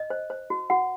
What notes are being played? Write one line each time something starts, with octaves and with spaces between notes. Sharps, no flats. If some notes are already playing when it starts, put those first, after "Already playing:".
Already playing: D#5
C5
C5
F#4
F#4 F#5